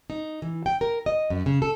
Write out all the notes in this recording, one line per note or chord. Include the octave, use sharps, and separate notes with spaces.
D#4
E3
G5
A#4
D#5
F#2
C#3
A4